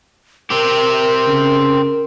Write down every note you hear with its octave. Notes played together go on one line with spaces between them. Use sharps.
C4 G4 A#4
C#3